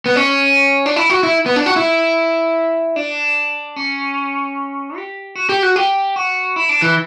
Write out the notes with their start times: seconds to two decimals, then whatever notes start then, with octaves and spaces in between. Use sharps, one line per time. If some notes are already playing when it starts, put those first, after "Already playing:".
0.06 B3
0.16 C#4
0.86 D4
0.96 E4
1.10 F#4
1.23 E4
1.46 B3
1.56 D4
1.66 F#4
1.76 E4
2.96 D4
3.76 C#4
4.96 G4
5.35 F#4
5.49 G4
5.63 F#4
5.76 G4
6.16 F#4
6.56 E4
6.69 D4
6.82 E3